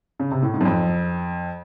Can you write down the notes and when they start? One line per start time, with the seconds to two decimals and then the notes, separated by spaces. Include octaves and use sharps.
0.20 C#3
0.31 C3
0.43 A2
0.54 G#2
0.61 F#2
0.65 F2